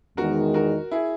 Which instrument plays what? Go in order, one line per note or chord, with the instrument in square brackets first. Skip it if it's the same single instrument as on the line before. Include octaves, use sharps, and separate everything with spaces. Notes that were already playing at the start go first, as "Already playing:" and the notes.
[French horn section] E2 D#3 G#3 [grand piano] F#4 A#4
[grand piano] F#4 A#4
E4 G#4